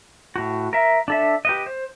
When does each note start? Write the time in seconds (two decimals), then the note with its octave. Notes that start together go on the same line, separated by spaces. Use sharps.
0.36 A2 F#4
0.73 A#4 E5
1.08 D4 A4 E5
1.45 G4 B4 D#5
1.66 C5